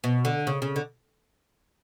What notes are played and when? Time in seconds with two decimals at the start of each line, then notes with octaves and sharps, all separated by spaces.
0.04 B2
0.25 D3
0.47 C#3
0.62 C#3
0.76 D3